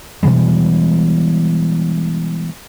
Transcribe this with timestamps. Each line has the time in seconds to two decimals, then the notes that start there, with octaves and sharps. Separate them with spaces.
0.23 B2 E3 G3 G#3